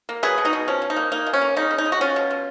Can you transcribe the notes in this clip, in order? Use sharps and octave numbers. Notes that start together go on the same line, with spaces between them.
A#3
F#3 G#4 B4
B2
D#4 F#4
B2
F3 C#4
F3
D#4
A#3
A#3 D#4
B2
C#4
A#3
C#3 D#4
C#3
D#4
G#3
F#4
G#3 C#4 F4
B2
B2